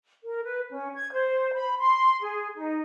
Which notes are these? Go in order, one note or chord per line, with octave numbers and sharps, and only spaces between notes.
A#4
B4
C#4
G#6
C5
B5
C6
G#4
D#4